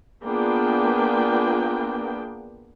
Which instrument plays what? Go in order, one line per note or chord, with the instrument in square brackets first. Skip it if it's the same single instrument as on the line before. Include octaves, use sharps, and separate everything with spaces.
[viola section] A#3 B3 D4 F4 G#4 G5